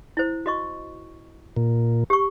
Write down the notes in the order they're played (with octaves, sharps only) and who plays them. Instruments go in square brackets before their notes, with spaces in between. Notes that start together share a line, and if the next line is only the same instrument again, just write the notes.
[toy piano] E4 C5
F#4 D#5 C#6
[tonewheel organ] A#2
[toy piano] G4 C#6